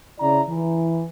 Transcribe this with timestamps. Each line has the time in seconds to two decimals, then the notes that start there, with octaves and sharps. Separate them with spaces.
0.20 C#3 E4 D5 A#5
0.48 E3